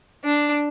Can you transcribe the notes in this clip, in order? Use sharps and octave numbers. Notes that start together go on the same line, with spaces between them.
D4